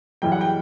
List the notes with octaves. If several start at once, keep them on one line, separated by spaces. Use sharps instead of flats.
F#2 E3 G3 G5
F#5
G5